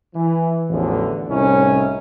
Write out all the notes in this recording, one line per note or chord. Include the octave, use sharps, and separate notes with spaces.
E3
A1 E2 D3 F3
C2 A2 C#4 D#4 E4